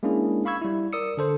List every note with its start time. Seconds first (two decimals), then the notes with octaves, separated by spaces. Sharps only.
0.03 G#3 A#3 C#4 D4 E4 G#4
0.45 F5 B5 C#6 E6 G#6
0.61 G3 E4
0.93 A#4 D5 D#6 E6 C#7
1.17 D3 A4 C5